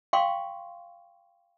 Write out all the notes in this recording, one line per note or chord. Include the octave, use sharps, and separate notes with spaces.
F5 G5 C6 C#6